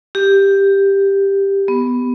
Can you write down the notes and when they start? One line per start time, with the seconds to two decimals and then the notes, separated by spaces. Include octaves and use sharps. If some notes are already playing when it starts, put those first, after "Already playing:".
0.15 G4
1.68 B3